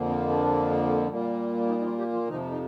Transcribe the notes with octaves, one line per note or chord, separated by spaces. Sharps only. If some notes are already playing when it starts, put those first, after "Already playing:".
Already playing: F2 D3 F3 A#3
C4
D4
A#2 G3 A#3
D#3 D#4
D#4
F3 F4
G3 G4
F3 F4
F2 C3 D#3 F3 D#4
D#4